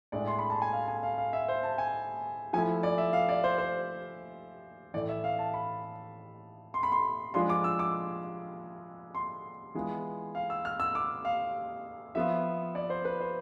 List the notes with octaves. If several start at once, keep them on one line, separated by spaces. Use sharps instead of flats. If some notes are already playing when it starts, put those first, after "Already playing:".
A2 G#3 D4 D5
C6
B5
A5
G#5
F5
G#5
F5
F5
E5
C5
A5
G#5
F3 A3 E4 G#5
D5
E5
F5
D5
C5
C5
A2 E3 A3 D5
E5
F5
A5
B5
C6
B5
C6
F3 G#3 D4 F4 C6
D6
E6
D6
C6
E3 G#3 B3 F4
F5
E6
F6
E6
D6
F5
F3 B3 F4 E5
D5
C5
B4
C5